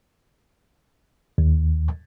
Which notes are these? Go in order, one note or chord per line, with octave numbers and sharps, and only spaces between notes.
D#2